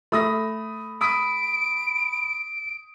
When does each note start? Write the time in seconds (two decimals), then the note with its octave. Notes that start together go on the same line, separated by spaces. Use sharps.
0.12 A3 B5 D#6 A#6
1.01 B5 D#6 B6 D7